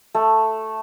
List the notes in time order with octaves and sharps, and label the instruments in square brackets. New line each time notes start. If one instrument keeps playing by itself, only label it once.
[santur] A3